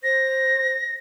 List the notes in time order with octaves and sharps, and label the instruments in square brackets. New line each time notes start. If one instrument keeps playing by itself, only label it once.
[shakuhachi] C5 [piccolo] A#6